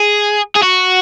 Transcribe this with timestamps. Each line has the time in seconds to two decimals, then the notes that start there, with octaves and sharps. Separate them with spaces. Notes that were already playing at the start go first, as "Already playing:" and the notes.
Already playing: G#4
0.55 G#4
0.62 F#4